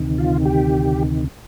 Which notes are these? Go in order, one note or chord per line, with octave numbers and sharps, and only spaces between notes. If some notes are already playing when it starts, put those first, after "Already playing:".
Already playing: D2 C3 D#3
F4
G4